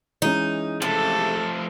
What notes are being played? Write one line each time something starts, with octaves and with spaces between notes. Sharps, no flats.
E3 G#3 C#4 D#4
C3 F3 A3 A4